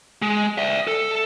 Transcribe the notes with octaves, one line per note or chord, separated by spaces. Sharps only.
G#3
D5 E5
A4